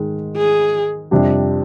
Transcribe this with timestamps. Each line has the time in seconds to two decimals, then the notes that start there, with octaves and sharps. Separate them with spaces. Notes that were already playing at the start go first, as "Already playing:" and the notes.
Already playing: G#2 D#3 G#3
0.37 G#4
1.11 F2 C3 G3 D4 G4